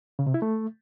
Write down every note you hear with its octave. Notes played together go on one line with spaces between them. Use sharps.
C#3
C3
E4
A3